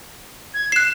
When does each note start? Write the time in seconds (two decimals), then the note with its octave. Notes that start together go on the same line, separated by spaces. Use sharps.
0.54 G#6
0.72 F#6 C7 E7